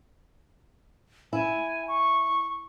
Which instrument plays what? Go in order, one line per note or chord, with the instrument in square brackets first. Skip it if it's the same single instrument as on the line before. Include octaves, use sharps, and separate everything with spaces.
[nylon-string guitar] E4 [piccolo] G#5
[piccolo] C#6